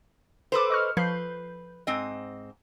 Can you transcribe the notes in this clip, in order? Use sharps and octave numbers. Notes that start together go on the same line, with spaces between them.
A4 B4 C5 D6 E7
D#5 C#6 F6
F3 B4 G6 C7
G#2 C4 D#5